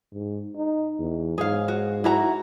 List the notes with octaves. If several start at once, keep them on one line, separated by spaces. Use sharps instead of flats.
G#2
D#4
E2
G#2 G#4 C#5 F5
F#4
E4 F#4 A#5